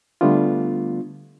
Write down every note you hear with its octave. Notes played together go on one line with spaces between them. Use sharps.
D3 G3 A3 B3 D4 F4